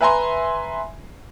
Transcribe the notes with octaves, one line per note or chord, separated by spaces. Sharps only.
B4 E5 G#5 A#5 C6